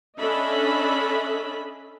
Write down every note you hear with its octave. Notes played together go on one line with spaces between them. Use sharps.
C#4 D4 A4 D#5 E5 B5